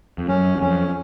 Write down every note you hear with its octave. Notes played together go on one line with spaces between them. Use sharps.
F2
F#2 C#4
E2
F2 C#4